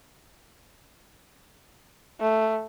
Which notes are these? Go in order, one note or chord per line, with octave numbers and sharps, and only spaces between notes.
A3